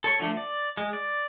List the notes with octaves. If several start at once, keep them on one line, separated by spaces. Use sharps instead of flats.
A4 C#5 C#6
D3 F3 A3 D4
D5
G#3
D5